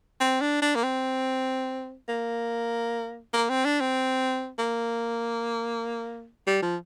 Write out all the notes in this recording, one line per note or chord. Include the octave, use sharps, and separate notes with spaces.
C4
D4
D4
A#3
C4
A#3
A#3
C4
D4
C4
A#3
G3
F3